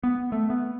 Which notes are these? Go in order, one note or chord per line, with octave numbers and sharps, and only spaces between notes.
B3
A3
B3